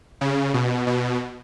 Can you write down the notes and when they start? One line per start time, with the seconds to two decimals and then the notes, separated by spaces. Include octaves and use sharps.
0.21 C#3
0.54 B2
0.87 B2